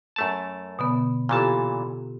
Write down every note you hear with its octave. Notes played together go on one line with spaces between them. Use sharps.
F#2 A3 A5
B2 D3 B3
A#2 E3 F4 G4 A4 A5